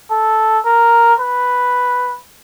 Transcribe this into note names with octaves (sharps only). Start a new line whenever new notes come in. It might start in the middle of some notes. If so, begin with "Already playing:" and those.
A4
A#4
B4